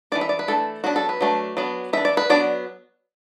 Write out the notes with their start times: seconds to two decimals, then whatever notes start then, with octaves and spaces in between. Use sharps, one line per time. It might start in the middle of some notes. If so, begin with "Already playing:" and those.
0.12 E3 A3 D4 D5
0.21 E5
0.29 D5
0.39 B4
0.48 E3 A3 D4 A4
0.84 F#3 B3 D4 F#4
0.96 A4
1.09 B4
1.21 F#3 A3 D4
1.57 F#3 B3 D4
1.93 E3 D4 E5
2.05 D5
2.17 B4
2.30 F#3 B3 D4 D5